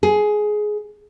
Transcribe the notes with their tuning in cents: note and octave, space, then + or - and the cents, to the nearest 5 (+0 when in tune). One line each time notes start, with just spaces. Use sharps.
G#4 +15